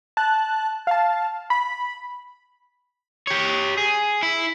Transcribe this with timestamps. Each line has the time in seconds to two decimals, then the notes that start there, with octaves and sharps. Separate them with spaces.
0.17 A5 F#6
0.87 F5 A5
1.50 B5
3.27 G4 C#5
3.78 G#4
4.23 E4